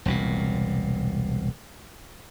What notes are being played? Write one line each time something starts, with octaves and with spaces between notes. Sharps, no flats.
E1 C2 A#2